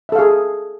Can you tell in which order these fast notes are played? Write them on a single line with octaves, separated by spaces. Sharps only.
E5 A4 F5 G#4